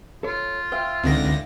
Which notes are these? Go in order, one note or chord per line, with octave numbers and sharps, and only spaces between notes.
F4 A4 C#5
C5 E5 F5 G5
C#2 D3 C4 D#4 A#6